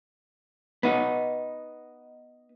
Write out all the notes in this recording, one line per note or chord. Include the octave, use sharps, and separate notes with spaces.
B3 D#4